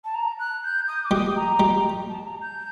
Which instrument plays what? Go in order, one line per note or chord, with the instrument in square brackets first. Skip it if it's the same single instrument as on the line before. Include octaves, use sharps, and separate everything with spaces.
[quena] A5
A#5
F#6
G6
D#6
D6
[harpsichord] G3 [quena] D#6
[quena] A#5
[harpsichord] G3
[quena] A5
A#5
G6